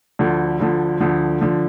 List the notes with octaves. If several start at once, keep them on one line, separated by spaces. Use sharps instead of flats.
D2 D3 F3
D2 D3 F3
D2 D3 F3
D3 F3